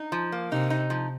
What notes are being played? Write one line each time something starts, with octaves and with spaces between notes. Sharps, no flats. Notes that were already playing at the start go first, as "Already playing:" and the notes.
Already playing: D#4
F3
A#3
C3 D#4
D#4
F3